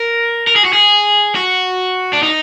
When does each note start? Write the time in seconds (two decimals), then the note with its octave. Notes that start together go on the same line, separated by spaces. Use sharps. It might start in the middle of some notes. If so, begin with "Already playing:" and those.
Already playing: A#4
0.47 A#4
0.56 G#4
0.65 F#4
0.73 G#4
1.35 F#4
2.13 D4
2.23 D#4